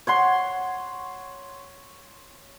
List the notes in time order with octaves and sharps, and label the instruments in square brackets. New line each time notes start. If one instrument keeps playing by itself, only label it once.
[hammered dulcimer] C#5 F#5 C6